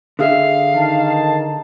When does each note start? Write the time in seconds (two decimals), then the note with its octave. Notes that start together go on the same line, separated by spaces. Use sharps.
0.19 D3 G#4 E5 F5
0.75 D#3 D#4 A5